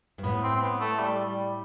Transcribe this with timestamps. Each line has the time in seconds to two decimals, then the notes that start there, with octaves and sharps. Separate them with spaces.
0.18 G2
0.24 A2 B3
0.43 C4
0.56 C4
0.62 B3
0.81 A3
1.00 G3
1.25 G3